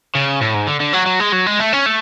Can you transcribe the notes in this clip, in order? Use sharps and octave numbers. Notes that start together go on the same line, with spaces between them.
C#3
A2
G#2
D3
D3
F#3
F#3
G#3
F#3
G#3
A3
C#4
A3